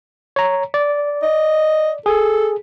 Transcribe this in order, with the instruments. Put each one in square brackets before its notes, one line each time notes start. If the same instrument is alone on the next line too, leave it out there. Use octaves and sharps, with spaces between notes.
[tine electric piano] C#5 A#5
D5
[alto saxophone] D#5
[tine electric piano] G#4 [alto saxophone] A4